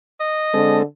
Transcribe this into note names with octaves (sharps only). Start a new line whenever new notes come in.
D#5
D3 G#3 C4 A4